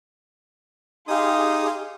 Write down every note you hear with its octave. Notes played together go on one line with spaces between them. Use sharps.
D#4 G4 G#4 F5 C6 D#6